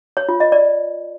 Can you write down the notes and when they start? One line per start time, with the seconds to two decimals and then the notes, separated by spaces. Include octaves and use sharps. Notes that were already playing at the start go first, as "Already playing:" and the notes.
0.17 C#5
0.29 F4
0.40 D#5
0.52 D5